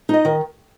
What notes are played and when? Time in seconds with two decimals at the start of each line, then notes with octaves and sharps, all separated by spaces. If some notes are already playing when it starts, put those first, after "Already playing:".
0.09 D#4 D#5
0.25 D#3